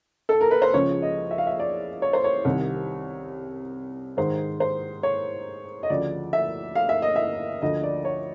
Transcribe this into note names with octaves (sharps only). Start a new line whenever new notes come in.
A4
A#4
B4
C5
C#2 C#3 F3 C#5
D#5
E5
F5
E5
D5
C#5
C5
C#5
C2 C3 D#3
G#2 D#3 C5
C5
C#5
D#5
D2 C#3 F3 D5
E5
F5
E5
D#5
E5
D2 D3 F3 D#5
D5
C#5